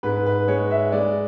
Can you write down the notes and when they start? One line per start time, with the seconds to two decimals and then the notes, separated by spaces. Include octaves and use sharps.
0.03 G#2 B4
0.26 B4
0.48 G#3 C#5
0.71 E5
0.92 G#3 D5